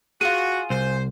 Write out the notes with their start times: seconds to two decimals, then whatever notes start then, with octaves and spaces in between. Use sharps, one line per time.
0.21 F4 F#4 G#4 D#7
0.70 C2 C5